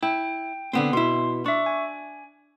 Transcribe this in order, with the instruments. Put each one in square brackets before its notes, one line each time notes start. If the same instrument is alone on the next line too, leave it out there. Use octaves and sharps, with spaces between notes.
[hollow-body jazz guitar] E4 [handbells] G5
[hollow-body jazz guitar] D3 B3 C4
[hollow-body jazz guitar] B2 E4 [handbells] C6
[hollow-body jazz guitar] D4 [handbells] E5 C#6
[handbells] G#5